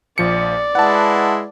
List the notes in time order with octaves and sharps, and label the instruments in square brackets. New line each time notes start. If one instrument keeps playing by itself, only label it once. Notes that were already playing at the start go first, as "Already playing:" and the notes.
[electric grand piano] A#1 F3 C#7 [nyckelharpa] D5
[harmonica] G#3 E4 B4 [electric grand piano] F#5 A5